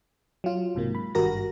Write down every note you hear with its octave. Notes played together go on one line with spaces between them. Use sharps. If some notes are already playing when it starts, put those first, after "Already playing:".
F#3 F4
B1 G#2 C3 A#3
B5
G#1 G2 G3 F#4 A#4 A#6